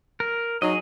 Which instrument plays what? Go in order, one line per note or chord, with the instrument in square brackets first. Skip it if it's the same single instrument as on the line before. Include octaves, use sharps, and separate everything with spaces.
[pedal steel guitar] A#4
[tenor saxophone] F#3 [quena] D#4 [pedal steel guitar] G#4 D#5